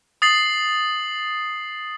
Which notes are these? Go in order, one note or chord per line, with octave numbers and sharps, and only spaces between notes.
D#6 A6 C7 F#7